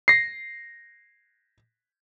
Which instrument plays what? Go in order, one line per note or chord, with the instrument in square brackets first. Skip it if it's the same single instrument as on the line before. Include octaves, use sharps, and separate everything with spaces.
[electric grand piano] A#6 C7